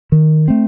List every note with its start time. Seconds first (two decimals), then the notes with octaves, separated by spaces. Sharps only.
0.12 D#3
0.48 A3 C4